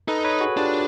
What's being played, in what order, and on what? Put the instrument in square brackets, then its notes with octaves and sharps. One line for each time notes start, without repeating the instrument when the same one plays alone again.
[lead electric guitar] D#4 [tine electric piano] A4 B4
[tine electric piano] B4 C#5
F#4 G#4
[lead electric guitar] D4 [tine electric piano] F4 G4